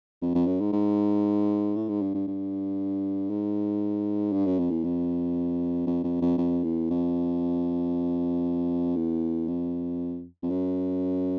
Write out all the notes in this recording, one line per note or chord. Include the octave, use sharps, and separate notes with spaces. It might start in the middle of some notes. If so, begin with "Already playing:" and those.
F2
F2
F#2
G#2
G#2
A2
G#2
G2
G2
G2
G#2
G2
F#2
F2
E2
F2
F2
F2
F2
F2
E2
F2
E2
F2
F2
F#2